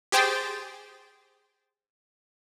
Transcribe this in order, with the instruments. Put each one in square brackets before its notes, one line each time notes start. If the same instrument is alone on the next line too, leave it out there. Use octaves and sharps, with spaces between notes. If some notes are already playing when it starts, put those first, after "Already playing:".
[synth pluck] G4 G#4 C5 G5 A6